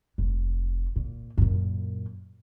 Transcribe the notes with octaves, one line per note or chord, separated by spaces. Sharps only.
F1
A#2
F#2 A#2